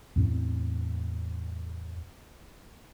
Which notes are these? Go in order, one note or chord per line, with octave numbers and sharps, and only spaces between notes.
E2 A2 C4